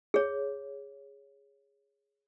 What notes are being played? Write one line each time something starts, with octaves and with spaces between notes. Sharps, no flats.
G#4 C#5